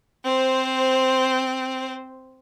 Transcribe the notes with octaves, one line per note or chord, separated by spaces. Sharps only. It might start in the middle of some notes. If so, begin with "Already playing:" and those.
C4 C5